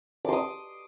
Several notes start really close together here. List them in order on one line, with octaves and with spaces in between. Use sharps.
D6 C6 D#6